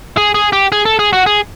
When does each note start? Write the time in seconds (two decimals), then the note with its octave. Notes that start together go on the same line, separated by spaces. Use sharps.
0.17 G#4
0.35 G#4
0.53 G4
0.72 G#4
0.86 A4
0.99 G#4
1.13 F#4
1.26 G#4